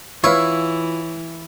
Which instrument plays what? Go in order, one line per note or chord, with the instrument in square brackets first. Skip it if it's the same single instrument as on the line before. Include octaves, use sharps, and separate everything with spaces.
[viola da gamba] E3 [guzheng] E4 [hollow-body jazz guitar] F4 B4 F5 [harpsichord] C#5